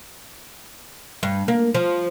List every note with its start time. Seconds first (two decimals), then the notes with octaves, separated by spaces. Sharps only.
1.23 G2
1.48 A#3
1.75 F3